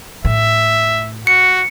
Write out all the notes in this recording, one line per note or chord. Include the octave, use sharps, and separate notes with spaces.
A2 E5
F#4 C#7